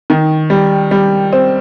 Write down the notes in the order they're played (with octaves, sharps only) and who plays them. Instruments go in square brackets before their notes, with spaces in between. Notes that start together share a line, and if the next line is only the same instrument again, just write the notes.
[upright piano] D#3
G3
G3
C4